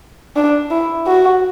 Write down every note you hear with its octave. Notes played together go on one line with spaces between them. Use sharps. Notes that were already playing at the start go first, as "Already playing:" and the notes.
D4
E4
F#4